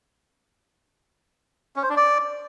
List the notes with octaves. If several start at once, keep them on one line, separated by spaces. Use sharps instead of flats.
C#4
C5
D4
D5